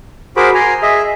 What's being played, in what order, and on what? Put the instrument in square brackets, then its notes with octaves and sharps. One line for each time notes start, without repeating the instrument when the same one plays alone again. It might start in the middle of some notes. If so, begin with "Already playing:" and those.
[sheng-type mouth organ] F#4 G#4 A#4 C5 B5 D6
G#5 A#5 C6
G#4 D#5 E5